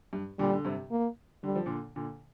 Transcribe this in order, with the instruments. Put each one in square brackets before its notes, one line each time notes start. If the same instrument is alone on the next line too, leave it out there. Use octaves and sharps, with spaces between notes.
[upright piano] G2
[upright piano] A#2 D3 [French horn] G3
[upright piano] D3
G2 C3
[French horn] A#3
[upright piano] D3 [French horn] G3
[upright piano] F3
A#2 D3
A#2 D3